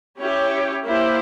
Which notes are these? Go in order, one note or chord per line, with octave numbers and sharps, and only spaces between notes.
C#4 E4 G4 C#5
A#3 E4 G4 C5